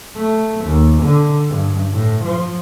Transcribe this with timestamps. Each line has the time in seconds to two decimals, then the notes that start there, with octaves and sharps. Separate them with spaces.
0.17 A3
0.66 D#2
1.04 D3
1.49 G2
1.92 A2
2.25 F3